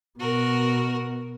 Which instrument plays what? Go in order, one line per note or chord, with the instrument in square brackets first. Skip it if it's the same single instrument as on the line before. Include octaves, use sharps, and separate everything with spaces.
[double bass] B2 [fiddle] F#4 A#4